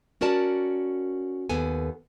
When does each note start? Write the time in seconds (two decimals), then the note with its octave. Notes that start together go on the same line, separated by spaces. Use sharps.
0.21 C#4 F#4 A#4 D5 A5
1.50 D#2 B3 A4 G#5